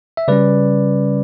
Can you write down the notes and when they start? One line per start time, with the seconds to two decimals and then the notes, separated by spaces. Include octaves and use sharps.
0.17 E5
0.28 C#3 G3 C#4 B4 D5